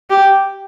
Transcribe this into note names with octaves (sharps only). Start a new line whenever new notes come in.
G4